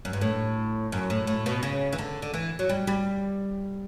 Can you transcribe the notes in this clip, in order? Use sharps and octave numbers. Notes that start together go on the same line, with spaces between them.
F#2
G2
A2
F#2
A2
A2
B2
C#3
E3
D3
D3
E3
F#3
G3
G3